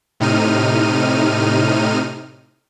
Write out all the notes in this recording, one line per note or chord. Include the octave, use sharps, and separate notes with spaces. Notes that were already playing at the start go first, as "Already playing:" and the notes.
A2 C3 D#4 F6 D#7